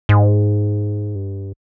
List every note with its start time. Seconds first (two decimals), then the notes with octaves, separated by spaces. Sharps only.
0.09 G#2
1.15 G2